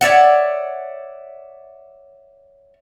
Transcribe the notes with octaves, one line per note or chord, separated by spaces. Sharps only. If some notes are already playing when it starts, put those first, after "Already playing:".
C#5 D5 E5 F#5